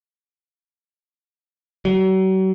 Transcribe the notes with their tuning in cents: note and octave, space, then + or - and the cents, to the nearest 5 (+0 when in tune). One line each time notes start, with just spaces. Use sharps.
F#3 +40